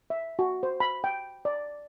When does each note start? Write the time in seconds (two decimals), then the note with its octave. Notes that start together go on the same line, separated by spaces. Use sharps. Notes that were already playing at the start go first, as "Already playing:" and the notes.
0.10 E5
0.39 F#4
0.63 C5
0.80 B5
1.04 G5
1.45 D5